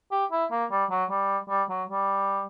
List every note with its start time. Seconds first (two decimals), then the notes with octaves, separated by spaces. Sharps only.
0.11 G4
0.32 E4
0.51 A#3
0.71 G3
0.90 F#3
1.10 G3
1.49 G3
1.70 F#3
1.90 G3